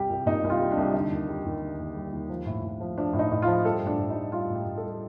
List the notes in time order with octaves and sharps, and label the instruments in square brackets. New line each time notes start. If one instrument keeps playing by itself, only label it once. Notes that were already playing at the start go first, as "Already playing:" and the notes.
Already playing: [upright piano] C2 G3 G4
C2
A#2 D#4
C2
F4
G3
D4
C2
D3 D#4
D#2
G3
D#2
D3
D#2
G3
D#2
F3
A2
A2
F3
F3 D4
A2
D#4
A2
F4
F3
G3 A4
A2 D4
A2
D#4
G3
G3 F4
A2 G4
A2
A4
G3